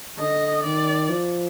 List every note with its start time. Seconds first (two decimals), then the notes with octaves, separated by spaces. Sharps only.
0.19 D3 D#5
0.63 D#3 D5
1.09 F3